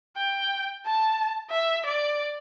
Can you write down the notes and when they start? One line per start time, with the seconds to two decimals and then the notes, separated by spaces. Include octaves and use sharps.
0.16 G5
0.86 A5
1.51 E5
1.86 D5